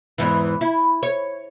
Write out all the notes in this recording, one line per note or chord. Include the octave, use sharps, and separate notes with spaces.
E2 G#2 E3
E4
C#5